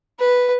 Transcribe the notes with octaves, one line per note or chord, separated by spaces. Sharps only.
B4